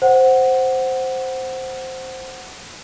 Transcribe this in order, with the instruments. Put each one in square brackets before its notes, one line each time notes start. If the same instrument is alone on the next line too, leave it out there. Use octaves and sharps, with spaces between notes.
[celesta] C5 F#5